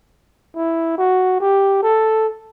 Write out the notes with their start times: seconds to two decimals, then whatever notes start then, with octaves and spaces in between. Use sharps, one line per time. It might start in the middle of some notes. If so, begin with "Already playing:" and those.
0.56 E4
0.98 F#4
1.40 G4
1.82 A4